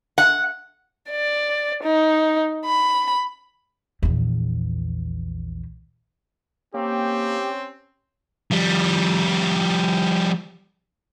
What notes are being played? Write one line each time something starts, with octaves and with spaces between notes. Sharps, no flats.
F#5
D5
D#4
B5
A#1 E2
A#3 C4 C#4 G4
F3 G3